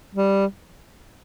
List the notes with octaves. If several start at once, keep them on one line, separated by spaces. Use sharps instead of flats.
G3